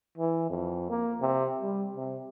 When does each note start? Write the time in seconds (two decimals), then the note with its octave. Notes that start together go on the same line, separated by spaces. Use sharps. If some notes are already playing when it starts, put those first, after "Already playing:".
0.18 E3
0.50 F2
0.90 A#3
1.21 C3
1.62 G3
1.96 C3